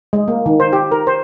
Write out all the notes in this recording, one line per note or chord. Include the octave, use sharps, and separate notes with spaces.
G#3
A#3
D#3
C5
G4
A#4
C5